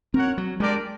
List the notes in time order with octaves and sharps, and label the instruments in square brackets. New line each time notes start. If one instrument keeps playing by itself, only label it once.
[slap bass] C4 [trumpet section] F#4 A#4 C#5 F#5
[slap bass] F#3
[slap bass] G#3 [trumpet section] D4 G4 A#4 D5